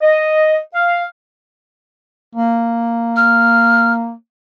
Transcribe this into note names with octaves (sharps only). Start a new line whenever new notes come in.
D#5
F5
A#3
F6